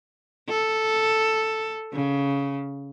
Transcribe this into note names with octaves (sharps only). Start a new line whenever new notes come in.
A4
C#3